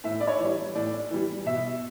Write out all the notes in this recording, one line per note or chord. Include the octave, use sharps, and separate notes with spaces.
A2 E5
D5
C#5
E3 G3
A2 D5
E3 G3
B2 E5